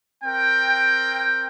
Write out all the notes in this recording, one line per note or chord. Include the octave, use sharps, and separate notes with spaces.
C4 A#4 G5